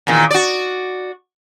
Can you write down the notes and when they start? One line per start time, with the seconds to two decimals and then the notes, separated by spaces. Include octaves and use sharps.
0.07 E2 A#2 D#3
0.31 F#4 D5